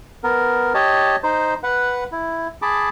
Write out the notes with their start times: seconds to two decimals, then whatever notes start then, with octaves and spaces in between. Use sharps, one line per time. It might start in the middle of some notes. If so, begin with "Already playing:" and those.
0.24 B3 A#4
0.74 G4 C#5 D#5 A5
1.23 D#4 C5
1.63 B4 F#5
2.12 E4
2.62 G#4 A5 B5 D6